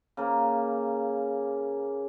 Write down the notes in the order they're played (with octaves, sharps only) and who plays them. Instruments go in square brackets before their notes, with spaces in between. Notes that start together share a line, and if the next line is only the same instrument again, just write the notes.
[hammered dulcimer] C#3 A#3